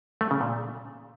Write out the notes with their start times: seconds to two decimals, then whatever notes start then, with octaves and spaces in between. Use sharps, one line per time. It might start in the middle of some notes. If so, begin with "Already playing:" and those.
0.21 A3
0.31 C#3
0.41 A#2